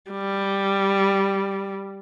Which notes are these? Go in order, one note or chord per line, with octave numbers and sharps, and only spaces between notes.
G3